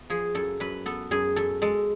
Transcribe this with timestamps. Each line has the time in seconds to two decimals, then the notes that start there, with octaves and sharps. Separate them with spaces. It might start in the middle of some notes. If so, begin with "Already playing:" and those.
Already playing: B3
0.10 F3 G#4
0.35 F#2 A4
0.60 F#2 B4
0.86 B3 A4
1.11 F#2 G#4
1.36 F#2 A4
1.62 G#3 A4